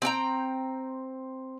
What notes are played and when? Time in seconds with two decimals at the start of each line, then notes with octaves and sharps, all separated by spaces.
0.02 C4 D4 G5 A#5